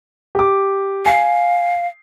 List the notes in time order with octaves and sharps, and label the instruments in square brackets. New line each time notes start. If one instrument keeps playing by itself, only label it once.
[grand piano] G4 D6
[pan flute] F5 [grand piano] G#5 C7